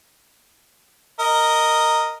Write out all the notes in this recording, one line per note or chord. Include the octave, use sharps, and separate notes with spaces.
A#4 D#5